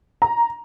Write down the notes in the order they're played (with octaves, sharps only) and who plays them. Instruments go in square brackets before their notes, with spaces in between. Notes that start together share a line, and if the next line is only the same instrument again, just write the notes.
[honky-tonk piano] A#5